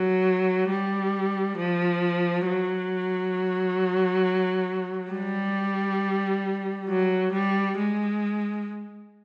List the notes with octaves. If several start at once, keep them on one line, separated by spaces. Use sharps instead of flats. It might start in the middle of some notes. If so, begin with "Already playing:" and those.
Already playing: F#3
G3
F3
F#3
G3
F#3
G3
G#3